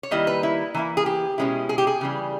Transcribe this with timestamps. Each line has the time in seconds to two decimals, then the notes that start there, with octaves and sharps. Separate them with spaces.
0.03 C#5
0.11 D#3 G3 A#3 E4 D#5
0.27 B4
0.43 E4
0.74 E3 A#3 E4
0.97 G#4
1.06 G4
1.38 B2 G#3 C#4 E4
1.69 G#4
1.78 G4
1.87 G#4
2.01 C#3 E3 G3